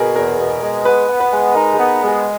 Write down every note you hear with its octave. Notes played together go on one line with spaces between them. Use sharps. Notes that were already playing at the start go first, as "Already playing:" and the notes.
Already playing: B2 G#4 A#4
E2 A#4
B2
G#3
B3 B4
B3
B4
G#3
D#4 A#4
G#4
B3
G#3
G#4